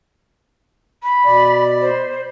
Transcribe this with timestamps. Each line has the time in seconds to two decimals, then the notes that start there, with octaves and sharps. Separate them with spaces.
1.03 B5
1.26 B2 D5
1.81 C5